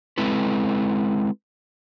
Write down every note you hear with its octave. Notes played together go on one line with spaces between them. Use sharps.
G#3 C4 E4 A4 B4